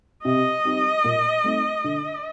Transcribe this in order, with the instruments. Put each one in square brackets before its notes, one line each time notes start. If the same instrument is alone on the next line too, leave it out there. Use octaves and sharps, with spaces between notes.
[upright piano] C3 [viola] D#5
[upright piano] G3 C4 D#4
A#2
A3 C4 D#4
D3